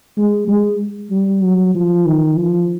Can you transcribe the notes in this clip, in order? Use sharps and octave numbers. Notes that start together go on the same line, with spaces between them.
G#3
G#3
G3
F#3
F3
D#3
F3